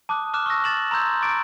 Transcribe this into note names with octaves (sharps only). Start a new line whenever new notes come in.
A5 D6 D#6 F#6
D6 F6 F#6 E7
C#6 E6 F6 A#6
A6 E7 F#7
A#5 C6 E6 G6 G#6
C#6 D6 F#6 A6 D7